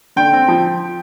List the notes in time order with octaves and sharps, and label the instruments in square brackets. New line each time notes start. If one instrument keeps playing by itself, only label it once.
[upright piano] D3 G5
C4
F3